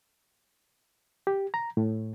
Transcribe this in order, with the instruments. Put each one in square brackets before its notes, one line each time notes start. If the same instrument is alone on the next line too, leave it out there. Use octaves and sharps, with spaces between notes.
[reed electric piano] G4
A#5
A2